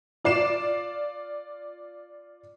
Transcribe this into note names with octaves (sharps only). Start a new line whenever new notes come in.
F4 D5 C7 E7